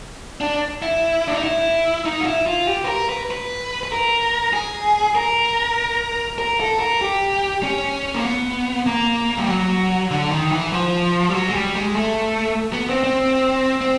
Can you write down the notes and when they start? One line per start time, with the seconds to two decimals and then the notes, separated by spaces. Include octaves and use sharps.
0.41 D4
0.82 E4
1.27 D4
1.35 D#4
1.44 E4
2.05 D#4
2.21 F4
2.27 E4
2.47 F4
2.68 G4
2.84 B4
2.88 A#4
3.09 B4
3.31 B4
3.83 B4
3.92 A#4
4.53 G#4
5.15 A#4
6.38 A#4
6.60 A4
6.80 A#4
7.01 G4
7.63 C#4
8.15 A#3
8.25 B3
8.86 A#3
9.37 G3
9.49 F#3
10.11 D3
10.32 D#3
10.52 E3
10.73 F3
11.29 G3
11.34 F#3
11.50 G#3
11.55 G3
11.76 G#3
11.96 A3
12.73 B3
12.89 C4
13.04 C4
13.81 C4